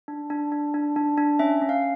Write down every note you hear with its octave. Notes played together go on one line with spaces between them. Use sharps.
D4
D4
D4
D4
D4
D4
C#4 E5
C#4
F5